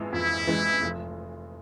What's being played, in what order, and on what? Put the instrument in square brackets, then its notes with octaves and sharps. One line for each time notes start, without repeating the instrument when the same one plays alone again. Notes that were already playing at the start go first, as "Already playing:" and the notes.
Already playing: [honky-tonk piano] F2 E3 G#3
[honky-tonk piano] F2 [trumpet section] E4
[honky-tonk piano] E3 G#3
F1